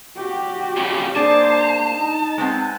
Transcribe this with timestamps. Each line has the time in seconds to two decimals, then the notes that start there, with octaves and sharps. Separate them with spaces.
0.16 F#4 G4
0.77 F2 C#3
1.15 A#3 D4 G#4 C5 D5 A5
1.94 D#4
2.38 G#3 B3 C4